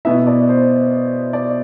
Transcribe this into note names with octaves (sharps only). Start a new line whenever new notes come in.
B2 B3 E4 E5
D5
C5
D5